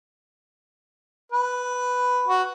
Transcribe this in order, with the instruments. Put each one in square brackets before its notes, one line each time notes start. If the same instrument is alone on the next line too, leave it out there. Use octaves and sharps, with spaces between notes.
[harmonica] B4
F#4